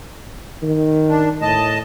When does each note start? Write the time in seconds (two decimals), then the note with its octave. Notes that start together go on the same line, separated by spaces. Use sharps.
0.62 D#3
1.09 D4
1.42 A2 D#5 A5